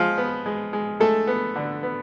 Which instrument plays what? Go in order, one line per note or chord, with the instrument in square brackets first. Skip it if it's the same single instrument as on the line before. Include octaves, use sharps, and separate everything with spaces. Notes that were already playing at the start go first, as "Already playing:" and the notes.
Already playing: [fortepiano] F3 G#3 F4
B3
G#3
G#3
G#3 A3 A4
B3
D3
B3